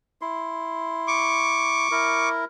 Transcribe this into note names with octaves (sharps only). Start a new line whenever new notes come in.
E4 C6
C#6 D6
E4 A#4